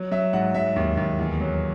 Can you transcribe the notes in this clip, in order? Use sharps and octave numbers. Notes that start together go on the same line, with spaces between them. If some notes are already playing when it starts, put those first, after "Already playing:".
Already playing: F#3
F#3 E5
G#2 F#5
F#3 E5
D#2
D#2
E2
F#3